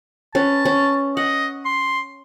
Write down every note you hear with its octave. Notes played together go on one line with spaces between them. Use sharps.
C#4 B4 A5
C#4
D#5 F#5
C6